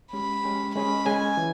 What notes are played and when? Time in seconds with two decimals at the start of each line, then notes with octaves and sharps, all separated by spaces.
0.13 G#3 C#4 G4 B5
0.44 G#3 C#4 G4
0.75 G#3 C#4 G#4 D#5 B5
1.05 G#3 C#4 G#4 D#5 G#5
1.37 E3